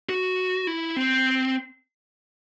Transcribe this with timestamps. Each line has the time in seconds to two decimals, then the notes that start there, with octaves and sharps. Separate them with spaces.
0.09 F#4
0.67 E4
0.97 C4